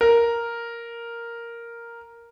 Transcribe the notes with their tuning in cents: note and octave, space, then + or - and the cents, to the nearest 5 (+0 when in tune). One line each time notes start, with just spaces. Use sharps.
A#4 +0